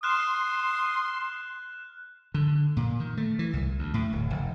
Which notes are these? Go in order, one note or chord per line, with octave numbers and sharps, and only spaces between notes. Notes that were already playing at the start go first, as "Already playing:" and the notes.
C6 D#6 F6 F#6 E7
D3
A#2
D#3
A3
E3
C2
D2
A2
D1
F1